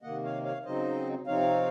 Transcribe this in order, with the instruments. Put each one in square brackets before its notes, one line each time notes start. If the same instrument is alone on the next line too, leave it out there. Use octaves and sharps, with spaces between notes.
[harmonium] C3 D#3 A#3 D#5 F#5
C#5 F5
C#5 F5
C#3 F#3 C4 D#4 C5 D#5
C3 F3 C4 D#4 C#5 F5